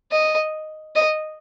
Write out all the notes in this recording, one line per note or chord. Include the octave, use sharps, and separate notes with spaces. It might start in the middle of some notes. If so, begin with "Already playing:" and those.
D#5
D#5